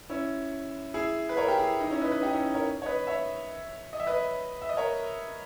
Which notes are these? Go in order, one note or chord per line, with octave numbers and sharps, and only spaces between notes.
C#4 E4
E4 G#4
B4
A#4 C#5
G4 A#4
E4 G#4
D#4
C#4 E4
B4 D#5
B4 D#5
D#4 G4
C#4 E4
A#4 C#5
C#5
B4 D#5
C#5 E5
D#5
E5
B4 D#5
E5
D#5
A#4 C#5